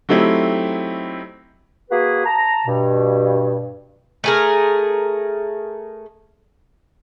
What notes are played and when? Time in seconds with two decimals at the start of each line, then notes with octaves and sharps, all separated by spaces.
0.09 F#3 A3 C4 D#4 E4 G4
1.91 A#3 F#4 G#4 B4
2.25 A5 A#5
2.67 G2 B2
4.24 A3 G#4 A#4